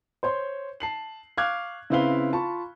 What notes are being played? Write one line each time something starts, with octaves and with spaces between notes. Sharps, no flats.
C5 C#5 C6
A5 C7 F#7
F5 C#6 D6 F6 F#6 G#6
C#3 C4 E4 B4 F5 G7
F4 A5 B5 C#6